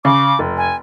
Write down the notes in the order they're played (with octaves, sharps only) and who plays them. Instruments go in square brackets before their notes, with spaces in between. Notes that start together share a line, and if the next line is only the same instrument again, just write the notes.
[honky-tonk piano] C#3 [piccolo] D6
[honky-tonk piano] F1
[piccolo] G#5